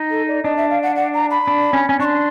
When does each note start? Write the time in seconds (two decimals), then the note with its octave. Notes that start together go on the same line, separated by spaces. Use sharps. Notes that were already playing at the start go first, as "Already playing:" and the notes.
Already playing: D#4
0.10 A4
0.28 D5
0.44 D4 D#5
0.57 E5
0.70 F5
0.83 F#5
0.96 F#5
1.14 A#5
1.31 B5
1.47 D4
1.73 C#4
1.89 C#4
1.99 D4 C#6
2.05 C6